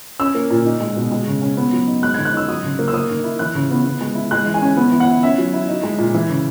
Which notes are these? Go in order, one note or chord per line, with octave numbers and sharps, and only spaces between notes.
C#4 E6
A#3
A#2
D#4
G#3
B2
G#3
C#3
C#4
B3
F#3
D#4
G#3 F#6
G#6
D#3
F#6
D#4 E6
F#3 D#6
C#3
A#3
E6
A#3 D#6
D#3
E4
E3 F#6
C#3
B3
B3
G#3
E4
G#3 F#6
E3
G#5
C#4
B3
E3
F#5
E4
C#4 E5
F#3
E4
D#4
G#3
A#2
E3
C#3